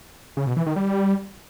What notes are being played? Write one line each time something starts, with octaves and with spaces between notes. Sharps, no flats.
C#3
B2
E3
D#3
G3